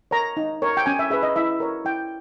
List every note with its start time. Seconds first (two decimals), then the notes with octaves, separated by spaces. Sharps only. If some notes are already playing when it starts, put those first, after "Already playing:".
0.11 A#4 C#5 A#5
0.37 D#4
0.62 A#4 C#5
0.77 G5
0.86 C#4 G#5
0.99 E5
1.10 G#4 B4 E5
1.23 D#5
1.36 E4 E5
1.60 A#4 C#5
1.85 E4 G5